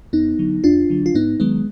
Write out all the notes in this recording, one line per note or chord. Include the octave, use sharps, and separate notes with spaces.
F2 B3 D#4
D3 F#3
F2 D4 F4
D3 F#3
F4
G#2 B3 D#4
D#3 F#3 G#3 B3